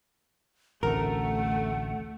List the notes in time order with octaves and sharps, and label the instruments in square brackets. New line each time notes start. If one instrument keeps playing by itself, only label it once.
[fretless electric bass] A1 D2 C3 [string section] A3 [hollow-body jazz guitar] A#4 [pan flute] F#5